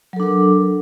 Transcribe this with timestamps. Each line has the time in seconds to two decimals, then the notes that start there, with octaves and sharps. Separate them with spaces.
0.13 F#3
0.16 A4
0.20 D4
0.23 A#4